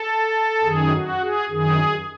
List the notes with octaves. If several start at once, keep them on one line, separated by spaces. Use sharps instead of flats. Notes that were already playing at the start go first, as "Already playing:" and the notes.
Already playing: A4
F#2 D#3 G#4
F#4
G#4
F#2 D#3 G#4